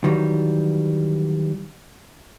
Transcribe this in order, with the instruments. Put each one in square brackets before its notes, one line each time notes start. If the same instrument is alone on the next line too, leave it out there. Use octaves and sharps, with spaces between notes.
[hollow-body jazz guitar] D#3 E3 F#3 G3